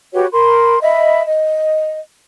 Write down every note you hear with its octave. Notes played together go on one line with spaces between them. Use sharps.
F#4 G4 B4 C#5
A#4 B5 C6
D#5 E5 B5
D#5